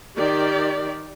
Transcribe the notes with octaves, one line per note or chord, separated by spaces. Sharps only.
D#3 G4 D5